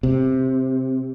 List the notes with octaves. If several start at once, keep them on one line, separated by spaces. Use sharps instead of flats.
C3